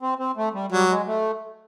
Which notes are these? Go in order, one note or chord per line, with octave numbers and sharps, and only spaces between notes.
C4
C4
A3
G3
F#3 G3
G#3
A3